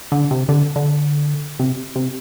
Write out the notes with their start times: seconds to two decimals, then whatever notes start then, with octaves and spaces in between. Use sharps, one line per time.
0.12 D3
0.31 C3
0.49 D3
0.76 D3
1.59 C3
1.96 C3